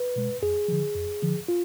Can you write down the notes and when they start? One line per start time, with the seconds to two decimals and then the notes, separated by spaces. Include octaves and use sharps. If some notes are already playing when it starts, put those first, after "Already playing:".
Already playing: B4
0.16 B2 G#3
0.42 F2 G#4
0.68 D3 F3
0.95 F2
1.22 D3 F3
1.48 F4